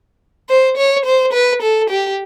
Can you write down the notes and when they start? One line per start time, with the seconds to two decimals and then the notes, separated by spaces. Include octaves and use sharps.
0.49 C5
0.77 C#5
1.06 C5
1.33 B4
1.62 A4
1.90 G4